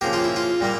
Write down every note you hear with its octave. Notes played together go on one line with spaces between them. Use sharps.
C#3 F3 A#3 G4
F4
E4
F4
A#2 G3 A#3